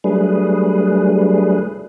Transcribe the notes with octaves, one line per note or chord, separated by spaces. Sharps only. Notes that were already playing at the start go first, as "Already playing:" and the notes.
F#3 G3 A3 D4 G#4 B4